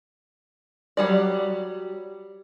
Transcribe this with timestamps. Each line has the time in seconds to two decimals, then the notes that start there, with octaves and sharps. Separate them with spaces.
0.97 F#3 G3 D5